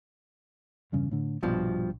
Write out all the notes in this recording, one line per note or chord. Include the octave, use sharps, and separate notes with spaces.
E2 G2 C#3
A2 D3
A#1 G2 B2 F3